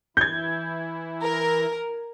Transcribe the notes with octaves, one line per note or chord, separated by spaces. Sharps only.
E3 E4 G6 G#6
A#4